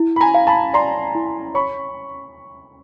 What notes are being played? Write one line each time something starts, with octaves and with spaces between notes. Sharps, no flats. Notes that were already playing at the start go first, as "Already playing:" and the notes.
Already playing: E4
B5
G#5 A#5
F5
A5 B5
D5 A#5 C6
E4
C#5 B5 C#6